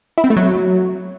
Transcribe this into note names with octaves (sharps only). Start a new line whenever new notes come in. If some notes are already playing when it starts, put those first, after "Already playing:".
E4
C4
A3
F#3